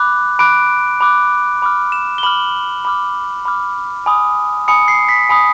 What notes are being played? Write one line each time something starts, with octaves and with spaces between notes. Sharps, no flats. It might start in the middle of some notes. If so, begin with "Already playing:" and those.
Already playing: B5 D6 F#6
B5 D6 F#6 D7
B5 D6 F#6
B5 D6 F6
E7
G7
B5 D6 F6 F#7
B5 D6 F6
B5 D6 F6
G#5 B5 D#6
G#5 B5 D#6 C#7
C7
B6
G#5 B5 D#6